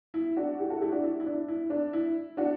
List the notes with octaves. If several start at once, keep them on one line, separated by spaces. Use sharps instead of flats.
E4
D4 F#4
E4 G4
F#4 A4
E4 G4
D4 F#4
E4
E4
D4
E4
D4
E4
D4 F#4